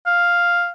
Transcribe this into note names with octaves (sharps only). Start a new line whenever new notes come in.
F5